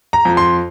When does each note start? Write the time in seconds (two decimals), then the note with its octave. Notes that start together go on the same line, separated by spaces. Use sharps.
0.13 A#5
0.25 F2
0.37 C6